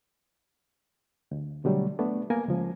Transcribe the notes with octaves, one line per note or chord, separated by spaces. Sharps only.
D2
B2 D3 F#3 G3 A3
A3 B3 D4
A#3 B3 A#4 G#5
C#2 F3